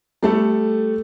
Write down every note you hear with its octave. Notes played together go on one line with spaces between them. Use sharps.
G3 A3 A4